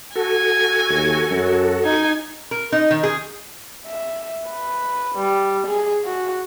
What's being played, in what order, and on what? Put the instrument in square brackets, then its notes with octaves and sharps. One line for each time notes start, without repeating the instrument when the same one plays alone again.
[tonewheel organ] F#4 A4 [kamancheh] G#5
[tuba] D#2
F#2
[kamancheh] D#4 G#5
[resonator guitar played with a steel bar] A#4
D#4
D#3
G#4
[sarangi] E5
B4
G3
G#4
F#4